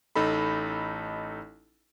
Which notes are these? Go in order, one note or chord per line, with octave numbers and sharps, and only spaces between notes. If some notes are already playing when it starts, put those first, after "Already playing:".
A1 D#4 A4 B5